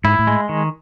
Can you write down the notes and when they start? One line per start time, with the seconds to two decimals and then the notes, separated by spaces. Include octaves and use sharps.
0.04 G#2 E4
0.19 A2
0.27 G#3
0.49 D#3